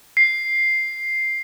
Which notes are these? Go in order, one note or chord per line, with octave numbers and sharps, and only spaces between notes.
C7